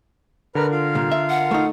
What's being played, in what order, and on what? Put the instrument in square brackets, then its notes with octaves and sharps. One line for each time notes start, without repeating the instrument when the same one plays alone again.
[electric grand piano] D3 A#4 [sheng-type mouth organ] B4 A#5 F6
[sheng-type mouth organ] F4 F5
[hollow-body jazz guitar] C2 A#2
E5
[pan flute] F#5
[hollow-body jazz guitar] A3 D#4